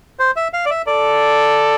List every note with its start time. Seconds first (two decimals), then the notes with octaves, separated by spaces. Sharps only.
0.19 C5
0.36 E5
0.53 F5
0.66 D5
0.70 E5
0.87 A4 D5